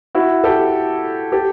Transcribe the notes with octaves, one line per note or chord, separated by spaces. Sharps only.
E4 F#4
G4 A4
G4 A4